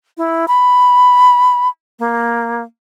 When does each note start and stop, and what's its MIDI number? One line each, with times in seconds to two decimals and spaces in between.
0.17 0.46 64
0.48 1.68 83
1.99 2.63 58